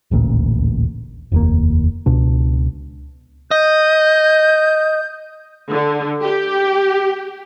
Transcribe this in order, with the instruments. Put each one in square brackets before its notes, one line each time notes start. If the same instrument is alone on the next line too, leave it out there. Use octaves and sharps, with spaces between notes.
[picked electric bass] D#1 A1 D2 A#2
F1 D#2 A#3
C#2 B2 D4
[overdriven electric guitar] D#5 [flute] G6
[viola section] D3
G4